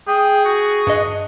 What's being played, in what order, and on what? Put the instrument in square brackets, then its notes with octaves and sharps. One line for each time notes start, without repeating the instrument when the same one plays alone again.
[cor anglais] G#4 [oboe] G5
[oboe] F#4
[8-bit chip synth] G2 D#5